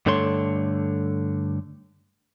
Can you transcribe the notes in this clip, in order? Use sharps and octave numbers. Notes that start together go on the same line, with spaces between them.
G2 D3 A3 C#5 C6